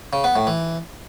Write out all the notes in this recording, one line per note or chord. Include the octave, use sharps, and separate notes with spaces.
C#3
B3
A2
E3